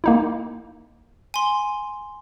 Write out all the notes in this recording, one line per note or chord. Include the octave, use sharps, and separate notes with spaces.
A#3 D#4 E4
G#5 C6